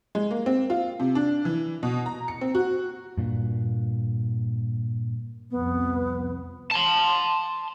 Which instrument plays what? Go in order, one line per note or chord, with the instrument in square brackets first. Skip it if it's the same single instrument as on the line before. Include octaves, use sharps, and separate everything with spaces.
[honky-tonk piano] G#3
A#3
C4
F4
C3
D4
E3
B2
A#5
C#7
C4
F#4
[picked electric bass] G2 A#2
[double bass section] C2 F2 [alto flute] B3
[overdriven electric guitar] A5 C6